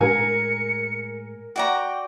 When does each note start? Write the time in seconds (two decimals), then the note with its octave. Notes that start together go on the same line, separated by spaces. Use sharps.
0.01 A2 G#3 A#4 G#5 C#7
1.56 F#4 D5 G5 A#5